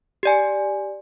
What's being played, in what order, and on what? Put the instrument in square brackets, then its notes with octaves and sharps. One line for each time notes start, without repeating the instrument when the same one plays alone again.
[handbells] G4 D5 G#5